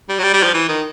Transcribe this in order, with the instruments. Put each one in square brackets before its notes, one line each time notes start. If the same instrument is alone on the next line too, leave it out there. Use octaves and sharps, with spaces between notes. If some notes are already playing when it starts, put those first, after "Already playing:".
[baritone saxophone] G3
F#3
G3
G3
F3
E3
D#3